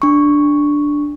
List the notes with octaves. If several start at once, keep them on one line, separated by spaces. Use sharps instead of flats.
D4 C#6